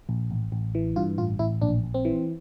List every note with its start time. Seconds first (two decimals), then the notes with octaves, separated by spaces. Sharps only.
0.09 A#1
0.31 A1
0.52 A1
0.75 E3
0.96 G2 F4
1.18 A1 F4
1.39 A1 E4
1.62 A#1 D4
1.84 A#1
1.94 C4
2.05 E3